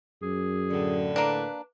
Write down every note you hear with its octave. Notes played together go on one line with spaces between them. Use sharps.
F#2 G#4
A2 D3
A#3 D4 B4